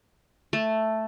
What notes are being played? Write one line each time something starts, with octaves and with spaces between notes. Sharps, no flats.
A3